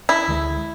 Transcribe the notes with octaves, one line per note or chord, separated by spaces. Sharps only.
E4
D2 D3 G#3